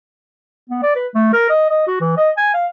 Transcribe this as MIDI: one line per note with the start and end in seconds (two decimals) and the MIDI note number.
0.70 0.82 59
0.83 0.95 74
0.96 1.07 71
1.15 1.31 57
1.33 1.47 70
1.50 1.69 75
1.70 1.85 75
1.87 1.96 66
2.00 2.17 52
2.18 2.30 75
2.37 2.53 80
2.54 2.66 77